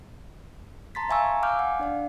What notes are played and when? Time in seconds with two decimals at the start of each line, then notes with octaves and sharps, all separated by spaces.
0.95 A5 A#5 C6 A6 B6
1.09 E5 F5 G#5 A#5 C#6 E6
1.43 F5 G#5 D6 F6 G6
1.59 F#5
1.80 D4 D5 F5